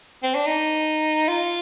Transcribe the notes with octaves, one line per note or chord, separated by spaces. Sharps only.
C4
D4
D#4
F4